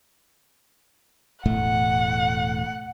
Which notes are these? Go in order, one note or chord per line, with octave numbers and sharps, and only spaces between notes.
E1 A2 A3 F#5